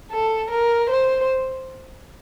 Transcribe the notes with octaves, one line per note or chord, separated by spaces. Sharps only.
A4
A#4
C5